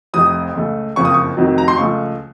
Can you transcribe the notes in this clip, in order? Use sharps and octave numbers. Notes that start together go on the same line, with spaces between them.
F1 F2 C3 D#6
C#2 C#3 A3
F#1 F2 C#3 F3 C#6
D#6
C#6
F1 F2 C3 D#3 F#3
A#5
C6
C#2 C#3 F3 A3 C#6